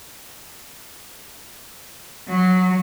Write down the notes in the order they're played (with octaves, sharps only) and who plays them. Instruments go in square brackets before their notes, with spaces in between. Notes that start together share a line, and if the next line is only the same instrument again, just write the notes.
[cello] F#3